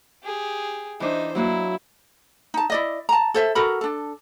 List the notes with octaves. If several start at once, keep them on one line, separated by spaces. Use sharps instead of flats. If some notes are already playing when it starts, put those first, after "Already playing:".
G4 G#4
E3 D4 D#4 C5
F#3 A#3 E4 F#4
D#4 A5
E4 D5 D#5
A5 A#5
A4 C5 E5
F#4 A4 A#4 B5
D4 A4